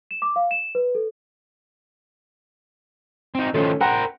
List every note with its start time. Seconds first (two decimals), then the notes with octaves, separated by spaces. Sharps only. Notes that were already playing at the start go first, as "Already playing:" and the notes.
0.11 E7
0.22 D6
0.36 F5
0.51 E7
0.75 B4
0.95 A4
3.35 C4 D#4
3.54 D#3 F3 A3 C#4
3.81 A#4 C5 F#5 G5 A#5